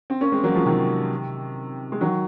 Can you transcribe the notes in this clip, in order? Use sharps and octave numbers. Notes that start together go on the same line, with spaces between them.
C4
A#3 C#4
G#3 C4
F#3 A#3
F3 G#3
C3 D#3
G#3
D#3 F#3